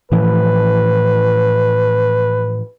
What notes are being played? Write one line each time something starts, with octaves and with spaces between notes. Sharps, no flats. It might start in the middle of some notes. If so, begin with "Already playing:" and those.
A2 E3 F3 B4